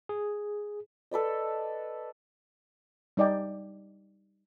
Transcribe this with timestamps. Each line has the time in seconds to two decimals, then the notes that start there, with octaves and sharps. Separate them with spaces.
0.09 G#4
1.11 A4 B4 D5 D#5
3.17 G3 D#4 D5 D#5 G5